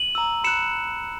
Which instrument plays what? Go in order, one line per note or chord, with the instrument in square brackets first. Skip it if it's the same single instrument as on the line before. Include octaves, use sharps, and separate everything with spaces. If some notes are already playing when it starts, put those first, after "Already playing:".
Already playing: [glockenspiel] D#7 F#7
A#5 E6
B5 F#6 C#7 E7